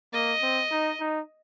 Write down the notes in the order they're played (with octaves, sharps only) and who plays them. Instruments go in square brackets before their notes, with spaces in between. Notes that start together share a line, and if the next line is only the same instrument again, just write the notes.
[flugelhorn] A#3 [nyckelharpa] D#5
[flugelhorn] C4
D#4
D#4